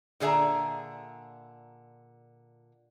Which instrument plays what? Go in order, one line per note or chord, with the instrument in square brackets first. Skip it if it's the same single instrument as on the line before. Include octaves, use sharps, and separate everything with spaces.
[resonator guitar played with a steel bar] A#2 D3 G#4 E5 A#5